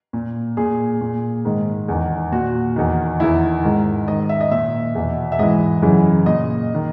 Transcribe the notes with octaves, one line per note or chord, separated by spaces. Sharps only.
A#2
A#2 G#4
A#2
G#2 D#3
E2 D#3
A#2 F#4
E2 D#3
E2 D#3 E4
G#2 D#3
G#2 D#3 D#5
E5
D#5
A#2 E5
E2 B2
E5
G#2 E3 D#5
F#2 C#3 E3
A#2 D#5
D#3